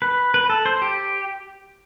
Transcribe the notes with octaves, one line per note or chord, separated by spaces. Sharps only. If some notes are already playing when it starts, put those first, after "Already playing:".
B4
B4
A4
C5
G4